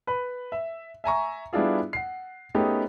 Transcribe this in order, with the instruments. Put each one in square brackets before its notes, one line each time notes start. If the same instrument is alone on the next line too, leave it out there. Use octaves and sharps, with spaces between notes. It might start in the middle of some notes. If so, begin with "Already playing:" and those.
[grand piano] B4 B5
E5
E5 G#5 A#5 C#6
G3 B3 D4 E4 F4 G#4
F#5 C7
A3 B3 C#4 D#4 G4 G#4